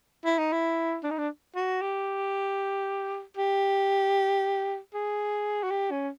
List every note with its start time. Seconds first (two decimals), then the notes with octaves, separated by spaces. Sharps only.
0.25 E4
0.38 D#4
0.53 E4
1.04 D4
1.11 D#4
1.18 D4
1.55 F#4
1.81 G4
3.37 G4
4.94 G#4
5.63 F#4
5.71 G4
5.91 C#4